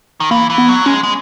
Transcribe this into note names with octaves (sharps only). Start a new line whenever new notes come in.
D#3
E3 A#3
E3
B3
F#3
G#3 C#4
G#3